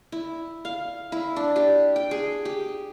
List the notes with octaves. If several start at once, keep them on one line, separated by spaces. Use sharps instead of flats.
E4
F5
E4
D4
G4
G5
G#4
G4